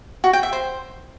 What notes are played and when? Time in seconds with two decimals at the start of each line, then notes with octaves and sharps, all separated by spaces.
0.24 F#4
0.33 G5
0.43 E5
0.53 C5